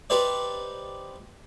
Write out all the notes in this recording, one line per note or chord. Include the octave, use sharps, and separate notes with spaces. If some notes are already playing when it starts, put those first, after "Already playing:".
D#4 G4 B4 C5 D5